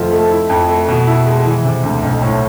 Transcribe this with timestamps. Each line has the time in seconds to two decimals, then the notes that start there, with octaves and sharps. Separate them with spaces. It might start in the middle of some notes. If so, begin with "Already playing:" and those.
Already playing: F1 F3 A3
0.12 A3
0.31 E4
0.49 F2
0.69 A3
0.88 B2
1.07 E4
1.26 G#3
1.45 E3
1.65 C3
1.83 D2
2.03 B1
2.22 A2